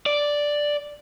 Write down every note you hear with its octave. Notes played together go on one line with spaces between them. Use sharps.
D5